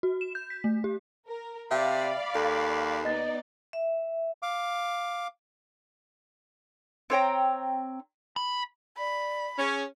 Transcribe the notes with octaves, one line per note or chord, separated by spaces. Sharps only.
F#4
E7
G6
B6
A3
G4
A#4
C3 D5 E5 F5 G5 B5
D#2 A4
B3 D#4 D5 D#5 A6
E5
F5 D6
C4 C#5 G5 A#5
B5
D5 B5
C#4 G#4